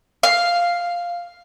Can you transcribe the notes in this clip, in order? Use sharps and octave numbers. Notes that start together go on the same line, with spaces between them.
F5